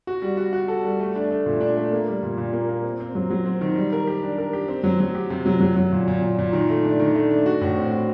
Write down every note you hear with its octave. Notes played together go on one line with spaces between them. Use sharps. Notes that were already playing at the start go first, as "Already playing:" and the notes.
F#4
G3
F#4
F#4
A4
G3
A3
D4
A3
A#2
D4
A3
A#3
G3
A#2
A#2
A#3
A#3
C4
C4
F#3
F#3
C4
D#3
G3
A#4
G4
D4
A#4
G4
C4
F#3
F#3
G4
C3
F#3
F#3
F#3
A#2
A#2
A#2
A#2
D#3
A3
D4
D#3
A3
D4
F#4
A2
C4
F#4